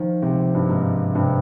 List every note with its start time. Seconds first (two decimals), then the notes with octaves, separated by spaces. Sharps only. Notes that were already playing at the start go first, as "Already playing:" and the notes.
Already playing: D#3 F3
0.22 C#2 C3
0.55 G2
0.69 G#2 A#3
1.14 G2 C3